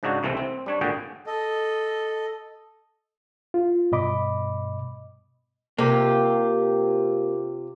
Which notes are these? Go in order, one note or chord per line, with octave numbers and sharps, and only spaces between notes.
G#2 C#3 D4 D#4 F#4
C2 C3 E3 A3 C4
C4
G3 D4 C#5
G#1 A#2 D3 F#4 G#4 G5
A4 D#5
F4
G2 B2 D#5 B5 D6
C3 A#3 F4 G4